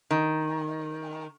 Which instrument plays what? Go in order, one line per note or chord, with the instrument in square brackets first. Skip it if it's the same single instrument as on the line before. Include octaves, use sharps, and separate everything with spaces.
[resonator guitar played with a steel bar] D#3